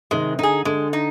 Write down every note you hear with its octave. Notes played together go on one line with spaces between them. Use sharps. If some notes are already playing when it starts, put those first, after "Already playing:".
C3 D#3 G#3
D3 D#4 G#4
D3 G#3
D#4